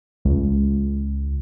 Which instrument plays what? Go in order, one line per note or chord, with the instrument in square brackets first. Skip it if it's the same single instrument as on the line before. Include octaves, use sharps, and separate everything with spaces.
[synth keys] C#2